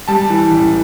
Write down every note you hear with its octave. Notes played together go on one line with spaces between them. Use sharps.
G3 A5
E3
A1